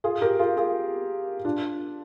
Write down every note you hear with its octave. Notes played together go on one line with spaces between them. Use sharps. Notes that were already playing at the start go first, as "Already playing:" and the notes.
F4 G#4
G4 A#4
F4 G#4
F4 G#4
D4 F4